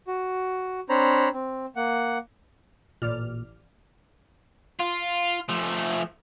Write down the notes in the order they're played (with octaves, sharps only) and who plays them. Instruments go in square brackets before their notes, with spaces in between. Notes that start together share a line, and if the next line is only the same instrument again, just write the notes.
[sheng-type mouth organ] F#4
C4 D4 C5 C#5 A#5 B5
C4
A#3 F#5
[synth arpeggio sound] A1 D5 F6 [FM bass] A#2
[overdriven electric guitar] F4
F3 A3